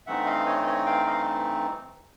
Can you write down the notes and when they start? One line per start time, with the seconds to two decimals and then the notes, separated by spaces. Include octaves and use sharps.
0.07 G2 E3 A3 C4 D#4 E5 F#5
0.26 D#5 F5
0.46 C#5 D#5
0.66 C#5 D#5
0.86 F5 G5
1.06 D#5 F5